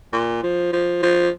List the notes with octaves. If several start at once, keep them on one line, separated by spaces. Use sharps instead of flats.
A#2
F3
F3
F3